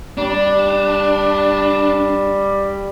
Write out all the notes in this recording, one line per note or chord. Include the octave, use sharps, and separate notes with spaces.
G3 D4